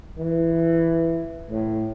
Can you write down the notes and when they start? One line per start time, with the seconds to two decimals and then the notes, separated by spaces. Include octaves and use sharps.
0.18 E3
1.50 A2